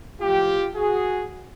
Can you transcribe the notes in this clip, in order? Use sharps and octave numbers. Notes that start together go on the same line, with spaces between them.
A2 F3 F4 G4
F#4 G#4